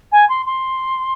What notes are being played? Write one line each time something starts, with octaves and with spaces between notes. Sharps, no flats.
G#5
C6
C6